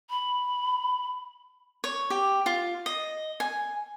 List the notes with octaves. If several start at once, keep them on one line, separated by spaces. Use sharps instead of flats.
B5
C#5
G4
F4
D#5
G#5